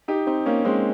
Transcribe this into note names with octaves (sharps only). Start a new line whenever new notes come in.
D#4 G4
C4 D#4
A#3 C#4
G#3 C4